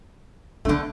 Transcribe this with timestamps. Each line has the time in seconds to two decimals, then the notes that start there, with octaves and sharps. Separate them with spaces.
0.65 D3 A3 B3 D4